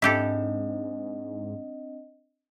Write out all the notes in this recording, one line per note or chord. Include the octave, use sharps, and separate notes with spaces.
G#2 C4 D4 E4 G4 A4 D#5